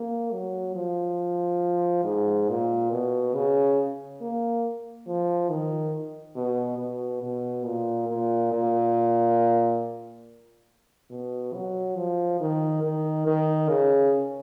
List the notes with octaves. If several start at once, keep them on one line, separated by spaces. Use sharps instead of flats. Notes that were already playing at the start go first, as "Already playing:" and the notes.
Already playing: A#3
F#3
F3
G#2
A#2
B2
C#3
A#3
F3
D#3
B2
B2
B2
A#2
A#2
A#2
B2
F#3
F3
D#3
D#3
D#3
C#3